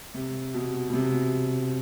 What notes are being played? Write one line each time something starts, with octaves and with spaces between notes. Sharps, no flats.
C3
B2
B2
C3